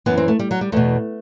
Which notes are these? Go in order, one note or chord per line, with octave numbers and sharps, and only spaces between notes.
F#2 E3 B3
C4
A3
G3
F#3
G3
E2 B2 A3